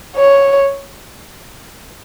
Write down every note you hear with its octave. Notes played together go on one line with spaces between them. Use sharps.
C#5